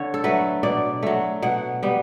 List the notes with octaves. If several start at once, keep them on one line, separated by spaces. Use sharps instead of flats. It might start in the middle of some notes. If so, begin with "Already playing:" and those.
Already playing: D3 C#5
A4
F#3 A3 B4
B2 D5
F#3 A3
B2 F#5
G3 B3